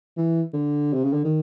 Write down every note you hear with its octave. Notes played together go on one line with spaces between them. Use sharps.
E3
D3
C3
C#3
D3
D#3